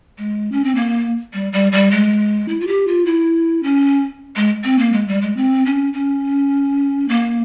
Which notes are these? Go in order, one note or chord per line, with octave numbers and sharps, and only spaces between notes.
G#3
C#4
C4
A#3
G3
G3
G3
G#3
E4
F4
G4
F4
E4
C#4
G#3
C4
A#3
G#3
G3
G#3
C4
C#4
C#4
A#3